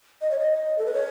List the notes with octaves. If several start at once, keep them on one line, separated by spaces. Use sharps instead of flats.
D#5
C#5
D#5
A4
B4
C#5